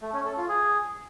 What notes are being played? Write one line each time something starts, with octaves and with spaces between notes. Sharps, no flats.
A3
C#4
A4
F4
G#4